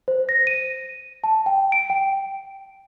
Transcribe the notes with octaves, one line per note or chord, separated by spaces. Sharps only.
C5
A#6
D#7
A5
G5
D7
G5